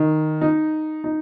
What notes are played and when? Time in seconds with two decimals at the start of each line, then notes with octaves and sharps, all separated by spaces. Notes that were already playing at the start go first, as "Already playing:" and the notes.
Already playing: D#3
0.41 D#4
1.04 D#4